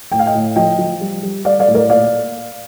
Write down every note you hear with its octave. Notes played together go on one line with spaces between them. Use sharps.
A2 G5
F5
D#5 G5
A2
F3 D#5 G5
F3
G3
G3
G3 D5 F5
D5 F5
A2
A#4 D5
A#2 D5 F5